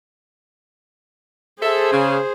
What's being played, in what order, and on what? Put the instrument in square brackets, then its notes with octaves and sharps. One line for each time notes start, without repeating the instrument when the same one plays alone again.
[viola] G#4 C5 [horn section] A4 E5
[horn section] C#3